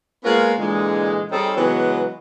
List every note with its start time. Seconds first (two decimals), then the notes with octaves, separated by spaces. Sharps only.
0.24 G#3 A#3 B3 C#4 F4 A#4
0.59 A#2 D3 E3 G#3
1.30 G3 C4 C#4 D#4 G#4 A4
1.56 C#3 E3 F#3 G#3 B3